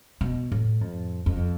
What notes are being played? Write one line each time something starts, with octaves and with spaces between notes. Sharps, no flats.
B2
A2
F2
F2